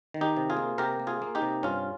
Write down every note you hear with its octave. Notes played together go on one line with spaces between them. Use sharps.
D#3
D#4 G4
C3
F4 G#4
A#3
C3 G4 A#4
A#3
F4 G#4
A#3
D#4 G4
C3
G2 C#4 F4